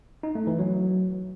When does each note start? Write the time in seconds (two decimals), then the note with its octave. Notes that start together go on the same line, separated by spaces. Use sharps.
0.23 D#4
0.35 A3
0.47 E3
0.59 F#3